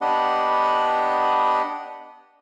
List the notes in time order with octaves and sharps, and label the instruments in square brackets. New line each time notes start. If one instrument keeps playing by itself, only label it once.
[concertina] B3 D4 G4 D#5 F#5 B5